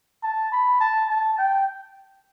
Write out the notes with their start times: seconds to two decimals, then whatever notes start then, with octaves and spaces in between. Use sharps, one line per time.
0.23 A5
0.52 B5
0.81 A5
1.09 A5
1.38 G5